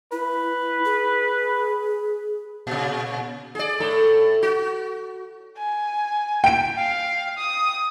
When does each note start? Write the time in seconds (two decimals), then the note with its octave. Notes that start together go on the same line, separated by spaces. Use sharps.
0.12 E4 B4
0.85 G#4
2.67 A#2 C#3
3.55 G#4 D5
3.80 A2 A4
4.43 F#4
5.57 G#5
6.44 G5 D7
6.77 F5
7.38 D#6